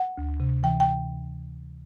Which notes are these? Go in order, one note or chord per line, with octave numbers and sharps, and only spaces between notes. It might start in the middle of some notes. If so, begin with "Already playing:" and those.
Already playing: F#5
D2
C3
E3 G5
G5